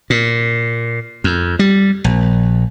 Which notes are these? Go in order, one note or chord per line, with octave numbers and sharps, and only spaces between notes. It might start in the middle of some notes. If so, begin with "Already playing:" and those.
A#2
F2
G3
A#1